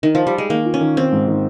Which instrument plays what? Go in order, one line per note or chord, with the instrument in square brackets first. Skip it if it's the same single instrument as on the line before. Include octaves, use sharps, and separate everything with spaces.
[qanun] D#3
F3
G3
G#3
[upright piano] D#3 [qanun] A#3
[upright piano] F4
[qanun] C#4
[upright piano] D#3
[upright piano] D#3 [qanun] C4
[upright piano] G#2
D#3